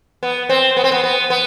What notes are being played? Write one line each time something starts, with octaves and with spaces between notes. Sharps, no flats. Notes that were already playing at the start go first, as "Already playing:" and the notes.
B3
C4
B3
C4
B3
B3
B3